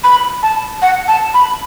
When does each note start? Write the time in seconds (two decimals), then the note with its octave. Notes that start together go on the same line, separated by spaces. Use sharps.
0.04 B5
0.43 A5
0.82 F#5
1.08 A5
1.34 B5